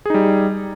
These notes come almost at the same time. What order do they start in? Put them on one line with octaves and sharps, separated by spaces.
G#4 D#4 G3